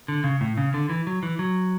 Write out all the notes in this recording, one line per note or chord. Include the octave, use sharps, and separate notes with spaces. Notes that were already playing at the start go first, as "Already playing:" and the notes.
D3
C#3
A2
C#3
D3
E3
F#3
E3
F#3